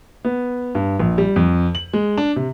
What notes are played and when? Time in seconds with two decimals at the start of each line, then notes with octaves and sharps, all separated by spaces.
0.25 B3
0.75 G2
1.00 A#1
1.18 G3
1.36 F2
1.75 F#7
1.93 G#3
2.17 D4
2.36 C3